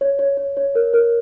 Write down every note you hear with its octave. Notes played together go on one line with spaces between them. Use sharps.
C#5
C#5
C#5
C#5
A#4
A#4